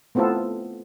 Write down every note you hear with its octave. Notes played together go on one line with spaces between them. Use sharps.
A3 B3 C4 E4 F4 A4